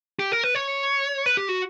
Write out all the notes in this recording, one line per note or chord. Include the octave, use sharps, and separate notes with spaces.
G4
A#4
B4
C#5
B4
G4
F#4